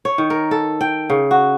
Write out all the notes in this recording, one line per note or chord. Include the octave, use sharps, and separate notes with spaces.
C#5
D#3
A#4
A4
G5
C#3
F#4